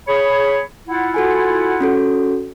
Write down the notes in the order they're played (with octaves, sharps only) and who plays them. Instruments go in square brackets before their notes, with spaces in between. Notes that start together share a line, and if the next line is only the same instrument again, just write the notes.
[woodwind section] G#4 C#5 B5
E4 F4 F#5
[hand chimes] F#4 A4 G#5
C#4 F#4 A4